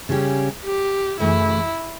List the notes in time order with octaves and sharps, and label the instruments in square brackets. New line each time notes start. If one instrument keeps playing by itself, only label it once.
[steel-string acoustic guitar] C#3 G3 C#4 G4
[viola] G4
[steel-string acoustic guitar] F#2 C#3 E3 A3 [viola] E4